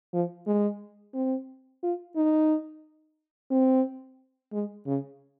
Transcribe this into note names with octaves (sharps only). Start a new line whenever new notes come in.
F3
G#3
C4
F4
D#4
C4
G#3
C#3